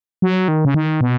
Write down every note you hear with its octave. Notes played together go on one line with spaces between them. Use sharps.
F#3
D#3
C#3
D#3
B2